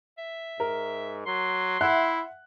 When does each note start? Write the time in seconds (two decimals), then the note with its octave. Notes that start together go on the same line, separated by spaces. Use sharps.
0.18 E5
0.60 G#2 A#4
1.26 F#3 C6
1.81 E4 E5 F#5 F#6